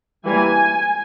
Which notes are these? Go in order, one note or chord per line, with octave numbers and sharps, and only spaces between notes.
E3 G3 A#3 G#5